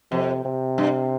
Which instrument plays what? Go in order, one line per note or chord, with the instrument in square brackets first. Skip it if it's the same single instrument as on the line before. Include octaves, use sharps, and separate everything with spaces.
[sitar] F2 [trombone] C3
[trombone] C3
[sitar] G2